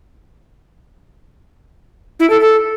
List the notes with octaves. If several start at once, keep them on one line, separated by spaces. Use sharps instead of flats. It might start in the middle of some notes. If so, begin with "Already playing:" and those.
E4
A4
A4